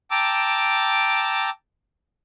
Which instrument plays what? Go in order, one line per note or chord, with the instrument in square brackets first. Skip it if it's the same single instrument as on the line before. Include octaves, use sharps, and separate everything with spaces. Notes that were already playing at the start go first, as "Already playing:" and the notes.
[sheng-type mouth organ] G5 A5 A#5 D6 E6